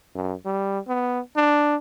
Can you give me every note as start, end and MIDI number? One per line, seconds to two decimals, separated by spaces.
0.15 0.34 42
0.45 0.79 55
0.88 1.20 59
1.36 1.76 62